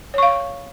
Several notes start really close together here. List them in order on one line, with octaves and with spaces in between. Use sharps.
C#5 C#6 F5